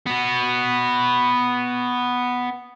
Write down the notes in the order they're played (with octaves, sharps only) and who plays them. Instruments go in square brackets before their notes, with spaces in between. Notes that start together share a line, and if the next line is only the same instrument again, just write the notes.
[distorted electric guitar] B3 F#4